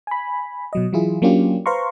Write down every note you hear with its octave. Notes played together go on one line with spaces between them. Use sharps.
G#5 B5
B2 F#3 D#5
E3 F#3 E4 F4 G#4
F#3 A#3 C#4 D4 F4 G4
B4 C5 F5 A#5 C6 C#6